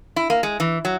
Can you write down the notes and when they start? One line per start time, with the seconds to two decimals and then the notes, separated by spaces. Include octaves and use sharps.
0.16 E4
0.30 A#3
0.43 G#3
0.60 E3
0.85 F#3